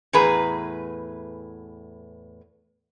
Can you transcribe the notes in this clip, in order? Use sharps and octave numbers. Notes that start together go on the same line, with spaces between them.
E2 A2 G#4 B4 A#5